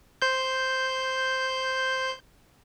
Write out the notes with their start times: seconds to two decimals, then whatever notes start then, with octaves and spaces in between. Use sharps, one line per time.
0.22 C5 G6